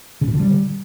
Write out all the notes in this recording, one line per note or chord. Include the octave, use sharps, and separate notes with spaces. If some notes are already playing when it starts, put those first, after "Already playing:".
C#3
A#2
D3
G3